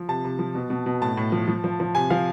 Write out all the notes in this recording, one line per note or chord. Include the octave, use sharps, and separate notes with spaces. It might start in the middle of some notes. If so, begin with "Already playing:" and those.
Already playing: F3
C3 A5
C3
F3
B2
B2
B2
A2 A5
A2
F3
F3
F3
F3
C3 G#5
F3 F5